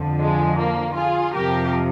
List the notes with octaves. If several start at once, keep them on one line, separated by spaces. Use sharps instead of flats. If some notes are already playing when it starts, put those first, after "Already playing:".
Already playing: F2 D3 F3
G#3
A#3
F4 G#4
F2 C3 F3 G4 A#4